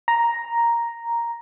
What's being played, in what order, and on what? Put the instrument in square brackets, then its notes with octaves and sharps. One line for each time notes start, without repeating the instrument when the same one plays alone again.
[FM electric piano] A#5